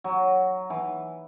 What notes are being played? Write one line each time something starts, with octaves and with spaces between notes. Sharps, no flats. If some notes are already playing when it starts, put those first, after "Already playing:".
F#3
E3